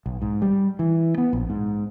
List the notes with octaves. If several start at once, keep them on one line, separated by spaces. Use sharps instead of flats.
B1
G#2
G3
E3
B3
A#1
G#2